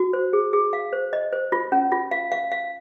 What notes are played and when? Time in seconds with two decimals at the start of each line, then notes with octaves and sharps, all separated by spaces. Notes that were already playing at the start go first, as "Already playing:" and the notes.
Already playing: F#4
0.13 C5
0.33 G#4
0.53 G#4
0.73 F5
0.93 C5
1.13 D#5
1.33 C5
1.52 F4
1.72 C#4
1.92 F4
2.11 F5
2.32 F5
2.52 F5